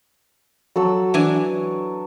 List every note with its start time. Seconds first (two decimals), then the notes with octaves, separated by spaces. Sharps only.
0.76 F#3 A4 E6
1.14 E3 D4 G#5